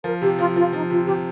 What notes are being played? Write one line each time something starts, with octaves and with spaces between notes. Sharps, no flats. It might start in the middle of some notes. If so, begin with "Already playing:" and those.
F3 A#4
C3 G4
F3 F4
F3 F4
F3 D#4
C3 F4
C3 G4